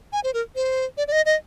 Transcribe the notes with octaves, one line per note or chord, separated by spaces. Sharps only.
G#5
C5
A#4
C5
D5
D5
D#5
D#5